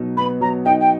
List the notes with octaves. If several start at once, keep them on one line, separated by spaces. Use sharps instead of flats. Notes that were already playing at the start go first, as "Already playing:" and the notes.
Already playing: B2 F#3 D#4
B3 B5
F#3 A#5
D#4 G5
G5